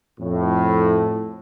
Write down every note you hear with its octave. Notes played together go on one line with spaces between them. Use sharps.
F2 A2